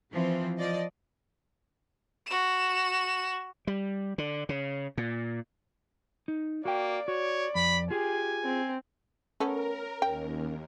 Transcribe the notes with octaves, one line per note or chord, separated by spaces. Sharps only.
E3 F3 C4
F3 D5 D#5
F#4 E7
G3
D3
C#3
A#2
D#4
A#3 F#4 D5 G5
F#4 C#5
F2 B5
F4 G4 G#4 G#5
C4
A3 B3 C#4 A4 A#4
D#2 G5